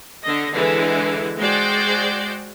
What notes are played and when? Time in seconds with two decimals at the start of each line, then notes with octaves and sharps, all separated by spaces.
0.22 D3 D#5
0.52 D3 E3 G#3 E4
1.39 G#3 F#4 C5 D5 G5